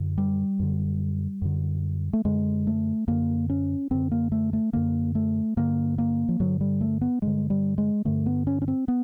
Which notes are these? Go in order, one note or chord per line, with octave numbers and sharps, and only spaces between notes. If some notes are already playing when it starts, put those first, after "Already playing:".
Already playing: F#2 D3
G3
F#2 D3
F#2 D3
A3
F#2 D3 G#3
A3
F#2 D3 A#3
C#4
F#2 D3 C4
A#3
A3
A3
F#2 D3 A#3
A3
G2 D3 A#3
A#3
F3
G2 D3 F#3
G3
A3
B3
G2 D3 G#3
G3
G#3
G2 D3 A3
B3
C#4
C#4
C4
B3